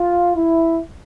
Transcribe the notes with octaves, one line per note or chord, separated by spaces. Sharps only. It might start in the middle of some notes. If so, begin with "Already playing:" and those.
Already playing: F4
E4